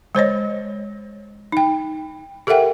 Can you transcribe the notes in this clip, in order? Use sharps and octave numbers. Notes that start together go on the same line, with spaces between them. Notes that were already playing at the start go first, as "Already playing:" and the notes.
G#3 C5 C#5 D#5
D#4 G5
G4 A4 A#4 E5 F#5 G5